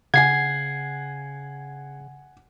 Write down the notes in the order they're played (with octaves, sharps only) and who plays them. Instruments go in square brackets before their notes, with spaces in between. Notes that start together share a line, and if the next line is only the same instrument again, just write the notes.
[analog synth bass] C#3 [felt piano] F#5 G#5 [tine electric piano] G#6 C7